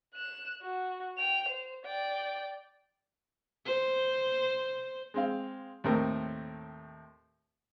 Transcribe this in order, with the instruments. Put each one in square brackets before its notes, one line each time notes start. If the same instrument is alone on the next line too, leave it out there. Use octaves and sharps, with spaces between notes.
[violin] F#6 E7
F#4
G5 F7
C5
D5 G5
[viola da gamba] C5
[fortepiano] G#3 C4 F5
D#2 A2 A3 C4 A4 A#4